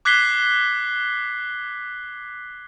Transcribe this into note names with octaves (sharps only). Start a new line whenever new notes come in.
D6 F#6 G#6 B6 C7 G7